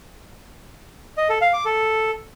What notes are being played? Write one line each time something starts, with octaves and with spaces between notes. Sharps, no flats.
D#5
A4
F5
D6
A4